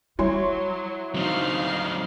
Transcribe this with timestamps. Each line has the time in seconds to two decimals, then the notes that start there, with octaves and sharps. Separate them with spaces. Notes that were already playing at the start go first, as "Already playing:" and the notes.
0.19 F#3 G3 E4 C#5 C6
1.15 F#3 C4 D#4 F5